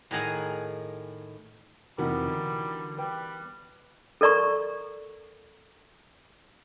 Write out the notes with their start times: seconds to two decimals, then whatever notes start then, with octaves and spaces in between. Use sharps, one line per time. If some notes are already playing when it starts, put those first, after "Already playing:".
0.11 A2 D#3 G#4 A#4 F#5 G#5
1.98 F2 C3 E3 G3 B3 D#4 F#4 A#4
2.28 D3
2.98 G3 B4 G5
4.21 A4 A#4 D5 A#5 C#6